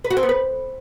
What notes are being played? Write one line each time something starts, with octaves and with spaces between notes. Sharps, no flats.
B4
F#4
C4
B3
B4